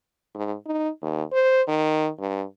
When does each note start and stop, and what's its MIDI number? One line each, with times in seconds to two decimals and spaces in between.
0.35 0.54 44
0.66 0.89 63
1.02 1.23 39
1.32 1.62 72
1.68 2.10 51
2.19 2.44 43